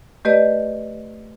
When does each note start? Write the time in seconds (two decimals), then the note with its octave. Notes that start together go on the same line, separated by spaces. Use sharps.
0.25 A3 G4 B4 D5 D#5